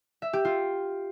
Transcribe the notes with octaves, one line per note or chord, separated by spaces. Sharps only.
E5
G4
F4